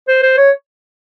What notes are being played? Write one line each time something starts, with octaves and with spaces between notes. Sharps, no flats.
C5
C5
C#5